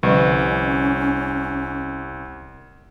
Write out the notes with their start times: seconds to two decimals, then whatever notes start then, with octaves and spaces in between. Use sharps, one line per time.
0.03 C2 D3 F3 G3 C#4